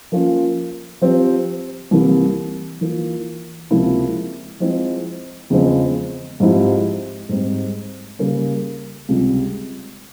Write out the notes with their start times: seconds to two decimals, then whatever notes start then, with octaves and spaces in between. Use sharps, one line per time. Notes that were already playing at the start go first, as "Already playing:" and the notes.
0.12 F3 A#3 C#4 F4
1.01 F3 C4 G4 C5
1.91 C2 C3 E3 A#3
2.81 E3 A#3 F4
3.71 C#2 C3 F3 A#3 E4
4.60 F3 G#3 C4 E4
5.50 E2 C#3 F3 G#3 C4
6.40 G#2 F3 C4 E4 G4
7.29 G#2 G3 C4
8.19 C#3 G3 A#3 C#4
9.09 C#2 C3 G3